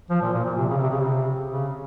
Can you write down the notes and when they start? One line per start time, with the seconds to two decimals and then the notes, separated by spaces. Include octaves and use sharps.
0.10 F3
0.22 A#2
0.34 A#2
0.45 A#2
0.57 C3
0.68 C#3
0.78 C3
0.90 C#3
1.00 C3
1.50 C#3